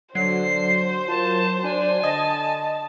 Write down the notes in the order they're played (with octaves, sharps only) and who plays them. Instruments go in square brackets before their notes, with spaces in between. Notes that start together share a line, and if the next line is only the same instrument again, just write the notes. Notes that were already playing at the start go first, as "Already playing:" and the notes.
[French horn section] D3 D4 [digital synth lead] F#3 [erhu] C5 [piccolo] C7
[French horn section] F4 A#4 [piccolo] A5
[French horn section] D4 [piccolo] G#5
[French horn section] D3 [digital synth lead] D#5 [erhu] A5